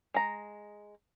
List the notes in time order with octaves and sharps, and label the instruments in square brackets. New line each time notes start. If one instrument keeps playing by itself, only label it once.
[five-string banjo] G#3 A#5